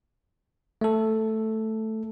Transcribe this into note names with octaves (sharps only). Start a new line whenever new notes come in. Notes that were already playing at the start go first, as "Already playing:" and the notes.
A3 A4